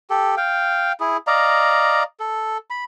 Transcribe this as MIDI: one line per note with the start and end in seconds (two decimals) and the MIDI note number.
0.10 0.35 67
0.10 0.35 69
0.37 0.92 77
0.37 0.92 79
1.00 1.17 64
1.00 1.17 68
1.27 2.03 74
1.27 2.03 75
1.27 2.03 77
1.27 2.03 82
2.20 2.58 69
2.70 2.84 83